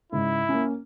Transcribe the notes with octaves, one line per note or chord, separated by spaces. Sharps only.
G#2 C#3 E4
A#3 C#4